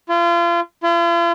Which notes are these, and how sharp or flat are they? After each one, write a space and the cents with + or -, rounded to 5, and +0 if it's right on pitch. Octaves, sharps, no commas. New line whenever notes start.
F4 -35
F4 -45